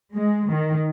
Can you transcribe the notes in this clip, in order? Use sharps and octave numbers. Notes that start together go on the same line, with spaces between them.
G#3
D#3